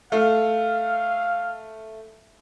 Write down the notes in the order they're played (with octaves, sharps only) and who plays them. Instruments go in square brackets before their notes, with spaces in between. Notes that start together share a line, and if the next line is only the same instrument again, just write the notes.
[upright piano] A3 [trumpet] F5